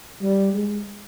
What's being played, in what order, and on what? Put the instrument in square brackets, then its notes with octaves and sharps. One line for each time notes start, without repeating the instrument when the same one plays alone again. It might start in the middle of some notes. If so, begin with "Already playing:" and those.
[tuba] G3
G#3